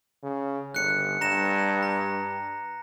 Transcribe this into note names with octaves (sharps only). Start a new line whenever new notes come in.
C#3
G1 F#6 C#7
G2 A#5 A#6 E7
A#5